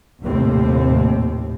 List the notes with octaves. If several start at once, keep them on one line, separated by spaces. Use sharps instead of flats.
F1 A#1 D#2 A2 C3 C4